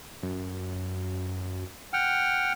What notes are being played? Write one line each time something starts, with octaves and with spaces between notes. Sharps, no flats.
F#2
F#5 G5 F6